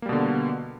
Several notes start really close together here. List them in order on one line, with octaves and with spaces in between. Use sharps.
A#3 G3 B2 D3